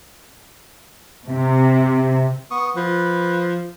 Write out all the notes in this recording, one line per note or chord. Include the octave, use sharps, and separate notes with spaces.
C3
B3 C#6 D#6
F3 B4